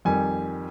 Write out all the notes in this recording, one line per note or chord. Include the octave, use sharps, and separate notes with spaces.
F2 D#3 G3 G#5